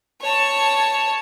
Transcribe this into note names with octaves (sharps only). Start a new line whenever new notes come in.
C#5 A5